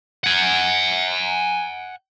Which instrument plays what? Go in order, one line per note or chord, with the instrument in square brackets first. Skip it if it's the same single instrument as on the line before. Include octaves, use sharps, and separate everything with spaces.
[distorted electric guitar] F#5 G#5